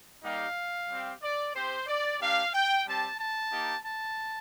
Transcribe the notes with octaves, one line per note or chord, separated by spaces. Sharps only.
G3 A#3 D#4 G4 F5
G3 C4 G4
D5
C4 G4 C5
D5
A#3 D4 G4 F5
G5
G3 C4 G4 A5
A5
A#3 D#4 G4
A5